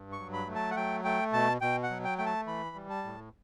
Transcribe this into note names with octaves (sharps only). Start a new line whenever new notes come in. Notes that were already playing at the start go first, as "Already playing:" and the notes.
Already playing: G2
C#6
F#3
B5
A3
A5
F#5
F#3 G5
A3 G5
B2 A5
B2 G5
F#5
F#3
G5
A3 G5
A5
E3 B5
G3
A5
A2